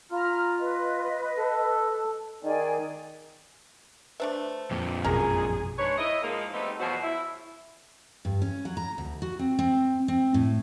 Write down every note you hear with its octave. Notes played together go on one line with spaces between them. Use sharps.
F4 A#5 B5 F6
B4 D#5
A4
D#3 G#4 D5 G#5
A3 D4 B4 C5 E5
F2 A#2
A1 F#2 B2 C#4 G#4 A#4 A#5
G#2 D4 B4 C#5
E4 D#5
G#2 F3 G#3 A#3
G3 A3 B3 C4 D#4
E2 B2 F3 F#3 F#4 C5
E4
G2
C#4
F#3
A#5
D2
F#4
C4
C4
C4
A2